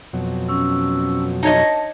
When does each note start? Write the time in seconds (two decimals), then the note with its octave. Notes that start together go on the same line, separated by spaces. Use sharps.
0.13 F2 B2 F#3
0.49 C#4 E6
1.43 D#4 C#5 D#5 A5